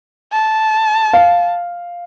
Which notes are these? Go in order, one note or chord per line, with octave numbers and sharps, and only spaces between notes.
A5
F5